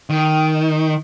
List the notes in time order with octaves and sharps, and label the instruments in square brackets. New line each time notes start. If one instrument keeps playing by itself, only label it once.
[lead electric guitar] D#3